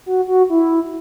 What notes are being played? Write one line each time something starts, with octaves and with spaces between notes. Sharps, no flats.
F#4
F#4
E4